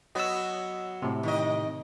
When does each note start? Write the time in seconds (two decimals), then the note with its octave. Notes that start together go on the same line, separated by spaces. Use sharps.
0.15 F#3 B3 F#4 D#5 E6
1.02 A2 C3
1.23 D#3 D#5